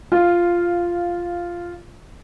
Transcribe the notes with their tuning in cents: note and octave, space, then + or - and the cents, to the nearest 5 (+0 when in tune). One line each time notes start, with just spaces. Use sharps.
F4 -5 F5 +0